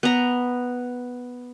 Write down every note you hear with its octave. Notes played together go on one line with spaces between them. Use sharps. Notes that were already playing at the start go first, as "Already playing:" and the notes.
B3 A#5